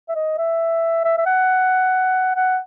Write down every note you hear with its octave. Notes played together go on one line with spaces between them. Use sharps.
E5
D#5
E5
E5
E5
F#5
F#5